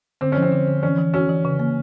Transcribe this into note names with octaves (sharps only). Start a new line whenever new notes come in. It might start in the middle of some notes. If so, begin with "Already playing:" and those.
D3 C4
F3 C#4
C4
D3
D3
E3 C#4
E3
C#4 F#4
E3
C#3
A#3